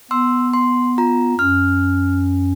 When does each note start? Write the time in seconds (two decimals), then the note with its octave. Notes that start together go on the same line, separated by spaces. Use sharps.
0.11 B3 C6 E6
0.53 C6
0.98 F4 A#5
1.39 F#2 C#4 F6